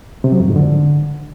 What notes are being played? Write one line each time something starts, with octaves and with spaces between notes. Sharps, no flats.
C3
F#3
F2
G#2
D3